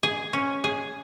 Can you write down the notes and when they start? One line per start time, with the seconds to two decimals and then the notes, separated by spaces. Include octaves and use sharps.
0.03 G#4
0.33 C#4
0.64 G#4